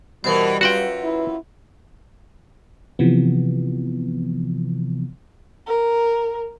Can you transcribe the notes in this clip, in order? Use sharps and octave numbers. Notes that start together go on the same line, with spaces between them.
B2 E3 G3 A#4 C5
F#2 F4 F#4 B4 F#5 G5
E4
C3 E3 F3 B3
A#4